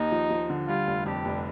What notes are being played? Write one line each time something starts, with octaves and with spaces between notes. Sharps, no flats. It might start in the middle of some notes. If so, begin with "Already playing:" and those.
Already playing: D#2 D#4
F3
F3
D3
G3 F4
F1
F2 G4
F1